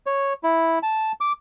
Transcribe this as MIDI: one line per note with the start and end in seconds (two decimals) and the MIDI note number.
0.06 0.33 73
0.43 0.79 64
0.83 1.12 81
1.21 1.32 86